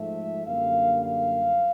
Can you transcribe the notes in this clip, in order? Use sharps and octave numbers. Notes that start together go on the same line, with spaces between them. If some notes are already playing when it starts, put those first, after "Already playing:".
Already playing: G#2 F3 A3 E5
F#2 D3 G3 A#3 F5
F5